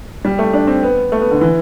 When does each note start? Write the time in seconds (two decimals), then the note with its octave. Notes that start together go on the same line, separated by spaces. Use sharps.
0.25 G3
0.39 A3
0.53 D4
0.67 C4
0.83 B3
1.12 A3
1.21 B3
1.31 D3
1.41 E3